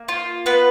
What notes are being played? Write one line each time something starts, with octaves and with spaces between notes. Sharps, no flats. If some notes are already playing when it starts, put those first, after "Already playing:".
Already playing: A#3
F4
B3 B4